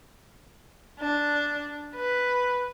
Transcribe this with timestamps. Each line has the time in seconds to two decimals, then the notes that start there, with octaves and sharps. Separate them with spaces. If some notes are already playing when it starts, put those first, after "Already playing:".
1.00 D4
1.96 B4